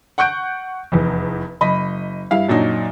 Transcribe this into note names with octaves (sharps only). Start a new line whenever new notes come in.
F#5 C#6 F#6 G6 D7
F1 E2
F#1 D#5 B5
G2 E4 F5
F#2 A#2 F#3 D4 D#4